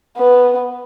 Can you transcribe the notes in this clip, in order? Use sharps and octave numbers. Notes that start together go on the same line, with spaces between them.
B3